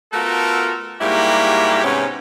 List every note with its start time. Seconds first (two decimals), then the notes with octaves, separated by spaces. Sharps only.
0.13 A3 B3 F4 F#4 A4 A#4
1.00 G#2 G3 A#3 E4 F#4 G4
1.83 G#2 C3 B3 C#4